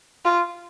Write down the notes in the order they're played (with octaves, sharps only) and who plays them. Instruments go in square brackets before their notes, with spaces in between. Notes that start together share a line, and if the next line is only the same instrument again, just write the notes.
[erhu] F4